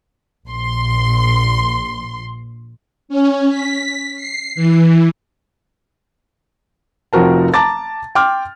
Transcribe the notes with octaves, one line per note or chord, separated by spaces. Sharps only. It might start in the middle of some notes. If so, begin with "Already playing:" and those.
A#1 C6
C#4
B6
C7
E3
F1 F3 C4 F#4 A#4 A5
A5 A#5 D6 A6
G5 C6 D6 F6